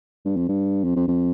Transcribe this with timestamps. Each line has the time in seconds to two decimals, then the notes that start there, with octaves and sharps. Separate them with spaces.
0.25 G2
0.37 F2
0.49 G2
0.84 F2
0.96 F2
1.08 F2